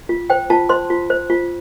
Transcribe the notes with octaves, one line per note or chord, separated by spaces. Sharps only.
F4
C5 G5
F4 A5
C5 C6
F4
C5
F4